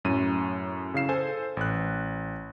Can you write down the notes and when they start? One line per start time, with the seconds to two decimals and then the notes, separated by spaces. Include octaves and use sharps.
0.05 F#2 A2 C#4 D#7
0.94 C#3 E4 F5 C7 E7
1.09 A4 C5 G#5
1.57 A1 F#6